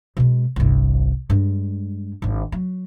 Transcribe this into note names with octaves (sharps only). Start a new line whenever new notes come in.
B2 G#3
G1 C2
G2 G#3
G#1 D4
F#3